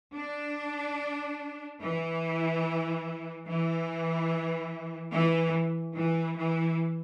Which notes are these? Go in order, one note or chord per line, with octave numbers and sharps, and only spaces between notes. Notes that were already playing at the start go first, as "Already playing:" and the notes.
D4
E3
E3
E3
E3
E3